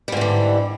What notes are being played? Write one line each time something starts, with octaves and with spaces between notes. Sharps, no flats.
G#2 D3 E3 G3